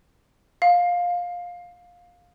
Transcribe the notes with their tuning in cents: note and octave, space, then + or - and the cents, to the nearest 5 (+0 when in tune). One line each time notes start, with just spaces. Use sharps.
F5 +15